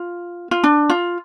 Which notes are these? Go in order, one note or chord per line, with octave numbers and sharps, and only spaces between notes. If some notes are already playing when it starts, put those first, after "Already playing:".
Already playing: F4
F4
D4
F4